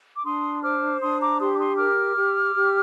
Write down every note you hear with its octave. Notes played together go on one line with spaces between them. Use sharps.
D6
D4 C6 D#6
C5 D6 F6
D4 C6 D#6
A#5 D6
G4 C6 D#6
D6
C6 D#6
A#4 D6 F6
G4
G4